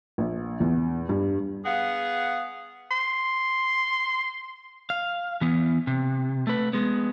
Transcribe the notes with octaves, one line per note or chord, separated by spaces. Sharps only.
A#1
E2
G2
B3 G#4 F5 F#5
C6
F5
E3 B3
C3
A3 B4
G#3 B3